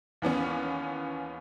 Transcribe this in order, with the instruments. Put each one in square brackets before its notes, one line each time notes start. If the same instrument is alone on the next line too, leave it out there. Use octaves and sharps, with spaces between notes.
[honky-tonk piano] D#2 E3 B3 C#4